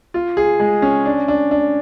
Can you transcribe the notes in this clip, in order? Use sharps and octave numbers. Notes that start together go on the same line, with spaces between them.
F4
G#4
G#3
C#4
D4
D4
D4